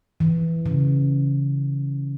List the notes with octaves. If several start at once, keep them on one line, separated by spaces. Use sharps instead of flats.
E3
C#3